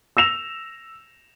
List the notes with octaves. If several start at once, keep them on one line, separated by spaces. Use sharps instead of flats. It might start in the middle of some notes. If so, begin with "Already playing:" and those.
E6 A#6 E7 F7